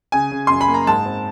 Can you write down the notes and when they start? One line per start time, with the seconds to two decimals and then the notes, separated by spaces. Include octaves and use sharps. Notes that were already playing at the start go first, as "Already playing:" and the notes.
0.12 C#3 G#5
0.31 C#3
0.47 F#2 C6
0.61 B5
0.68 A#3
0.74 A#5
0.87 G#2 A5
1.05 C4